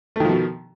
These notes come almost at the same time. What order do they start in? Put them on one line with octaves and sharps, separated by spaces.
A3 D#3 F3 B2